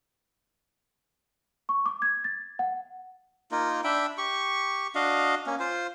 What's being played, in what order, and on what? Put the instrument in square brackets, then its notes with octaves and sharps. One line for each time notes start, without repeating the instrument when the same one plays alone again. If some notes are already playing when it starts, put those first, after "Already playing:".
[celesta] C#6
D6
G#6
A6
F#5
[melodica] A#3 D#4 F4 A#4
D4 E5 G5 B5
G4 C#6
D4 F#4 D#5 F5
A#3 C#4
F4 C5